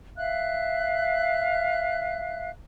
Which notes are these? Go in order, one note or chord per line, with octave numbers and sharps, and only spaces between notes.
E5 F5 F#6